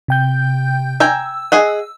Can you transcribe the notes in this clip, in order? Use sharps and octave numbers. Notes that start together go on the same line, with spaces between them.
C3 G5 G6
G5 G#5 A#5 E6
G#4 D#5 F#5